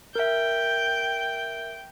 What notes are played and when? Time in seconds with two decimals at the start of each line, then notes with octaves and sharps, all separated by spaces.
0.16 A#4 E5 G5